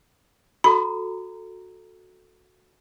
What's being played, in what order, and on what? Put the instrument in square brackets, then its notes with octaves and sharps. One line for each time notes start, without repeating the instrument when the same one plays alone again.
[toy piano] F#4 A4 A#5 [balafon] B5